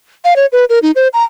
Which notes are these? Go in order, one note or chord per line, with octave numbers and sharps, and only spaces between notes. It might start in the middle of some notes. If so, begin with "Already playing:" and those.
F5
C#5
B4
A#4
D#4
C5
A#5